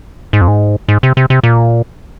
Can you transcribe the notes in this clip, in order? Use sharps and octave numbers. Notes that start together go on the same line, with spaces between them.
G#2
F2
G#2
G#2
C3
C3
C3
A#2